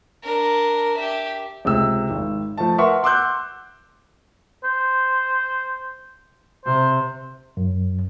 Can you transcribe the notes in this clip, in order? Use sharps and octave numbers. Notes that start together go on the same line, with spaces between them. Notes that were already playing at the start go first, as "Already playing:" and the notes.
D4 A#4
G4 E5
C#2 C3 E6
G#1
F3 A3 A5
A#4 B4 E5 F#5 C6 C#6
F#5 C6 D6 E6 F#6 G6
C5
C3 C5
F#2